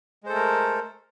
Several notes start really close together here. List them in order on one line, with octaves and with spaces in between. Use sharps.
G#3 C5 A4 A3 A#4